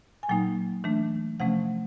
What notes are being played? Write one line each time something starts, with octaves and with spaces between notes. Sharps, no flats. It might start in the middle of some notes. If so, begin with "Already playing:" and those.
G#5
A#2 F#3 A#3 D#4 G5
E3 A3 D4
C3 F3 A3 C#4 F#5